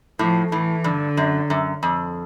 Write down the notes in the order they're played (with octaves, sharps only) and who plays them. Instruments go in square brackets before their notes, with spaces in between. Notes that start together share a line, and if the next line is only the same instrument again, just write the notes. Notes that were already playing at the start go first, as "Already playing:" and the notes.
[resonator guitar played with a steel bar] A2 [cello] F3
[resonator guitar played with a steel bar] A2 [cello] E3
[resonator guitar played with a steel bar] G2 [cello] D3
[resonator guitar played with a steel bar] F#2
F#2
F2